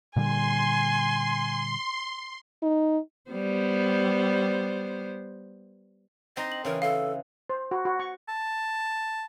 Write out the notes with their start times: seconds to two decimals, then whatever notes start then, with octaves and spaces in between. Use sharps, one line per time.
0.16 A#2 D3 G3 G#5 C6
2.63 D#4
3.31 G3 B3 C5
6.37 C4 D#4 D#5
6.52 F#7
6.65 C#3 E3 A#4
6.82 A4 F5
7.50 C5
7.71 F#4
7.85 F#4
8.00 C#6
8.29 A5